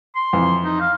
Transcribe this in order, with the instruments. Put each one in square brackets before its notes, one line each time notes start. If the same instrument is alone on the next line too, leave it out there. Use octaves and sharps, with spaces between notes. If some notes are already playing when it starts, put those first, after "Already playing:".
[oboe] C6
[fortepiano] F2 E3
[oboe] D#4
F5